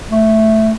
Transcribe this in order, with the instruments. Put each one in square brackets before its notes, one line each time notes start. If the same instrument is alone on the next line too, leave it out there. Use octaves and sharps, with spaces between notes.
[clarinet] A3